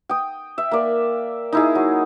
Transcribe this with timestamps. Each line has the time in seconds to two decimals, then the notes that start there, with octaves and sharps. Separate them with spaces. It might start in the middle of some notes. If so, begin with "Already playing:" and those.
0.09 G5 D#6
0.58 E5
0.71 A#3 D5
1.52 D#4 E4 G#4
1.75 F#3